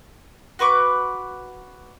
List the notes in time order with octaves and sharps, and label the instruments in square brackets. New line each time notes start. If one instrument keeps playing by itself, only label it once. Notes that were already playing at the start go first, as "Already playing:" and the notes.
[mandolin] F#4 B4 C#6 D6